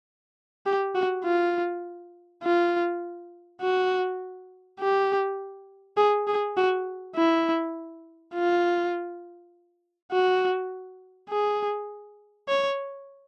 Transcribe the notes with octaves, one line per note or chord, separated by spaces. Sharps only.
G4
F#4
F4
F4
F#4
G4
G#4
G#4
F#4
E4
F4
F#4
G#4
C#5